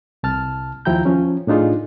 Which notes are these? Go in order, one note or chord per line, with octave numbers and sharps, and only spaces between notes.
C2 A5 F6
D#2 F3 E4 G5 A#5 G6
F3 C#4
A2 D4 D#4 F4 G#4